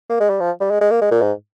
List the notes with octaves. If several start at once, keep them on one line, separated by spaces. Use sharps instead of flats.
A#3
G#3
G3
F3
G3
G#3
G#3
A#3
G#3
A#2
G#2